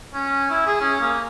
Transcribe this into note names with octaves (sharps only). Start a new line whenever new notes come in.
C#4
E4
G#4
C#4
A#3